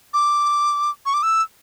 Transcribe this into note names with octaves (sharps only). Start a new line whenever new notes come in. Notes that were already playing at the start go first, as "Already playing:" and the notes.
D6
C#6
D6
E6